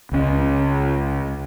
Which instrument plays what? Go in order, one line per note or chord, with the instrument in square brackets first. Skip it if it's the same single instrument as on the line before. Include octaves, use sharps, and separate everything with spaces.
[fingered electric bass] C#2 C#4